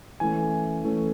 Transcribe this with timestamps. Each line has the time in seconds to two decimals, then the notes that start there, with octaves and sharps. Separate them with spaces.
0.20 E3 A3 C#4 G#5
0.84 E3 A3 C#4